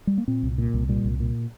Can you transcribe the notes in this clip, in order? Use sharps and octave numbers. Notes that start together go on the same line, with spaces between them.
G3
A#3
A#2 C4
C2
A#2
C2
A#2 G3
C2
A#2